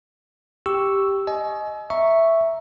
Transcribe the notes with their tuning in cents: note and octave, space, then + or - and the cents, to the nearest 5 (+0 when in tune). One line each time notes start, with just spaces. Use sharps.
G4 +0 C#6 +0 E6 +0
D#5 +0 G#5 +35
E5 +0 A#5 -5 C#6 +0